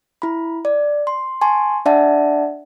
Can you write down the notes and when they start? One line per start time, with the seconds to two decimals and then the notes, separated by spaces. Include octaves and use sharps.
0.22 E4 B5
0.65 D5
1.07 C6
1.41 G#5 A5 C6 C#6
1.86 D4 D5 E5 F#5 A5